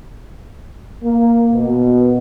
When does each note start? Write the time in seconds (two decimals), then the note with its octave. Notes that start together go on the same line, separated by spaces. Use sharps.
1.03 A#3
1.53 B2